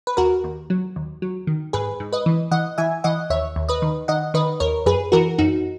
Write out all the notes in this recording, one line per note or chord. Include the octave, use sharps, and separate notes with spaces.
B4
D#2 F#4 A#4
D#2
F#3
D#2
F#3
D#3
G#2 G#4 B4
G#2
B4 D#5
E3
E3 D#5 F#5
E3 E5 G#5
E3 D#5 F#5
D#2 C#5 E5
D#2
B4 D#5
D#3
D#3 D#5 F#5
D#3 B4 D#5
D#2 A#4 C#5
F#2 G#4 B4
E3 F#4 A#4
F#2 D#4 F#4